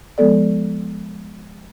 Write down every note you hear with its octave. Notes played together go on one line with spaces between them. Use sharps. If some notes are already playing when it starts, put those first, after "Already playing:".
F3 G#3 B3 A4 D5